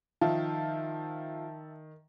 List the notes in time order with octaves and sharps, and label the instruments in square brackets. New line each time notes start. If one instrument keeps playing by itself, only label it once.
[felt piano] D#3 [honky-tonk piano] F3 F4 [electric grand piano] E5 A5